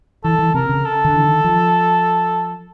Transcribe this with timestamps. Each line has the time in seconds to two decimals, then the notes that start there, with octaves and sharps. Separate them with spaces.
0.24 E3 A4
0.39 E3
0.54 C3 A#4
0.69 C#3
0.85 A4
1.04 D3
1.16 E3
1.24 D#3
1.44 F3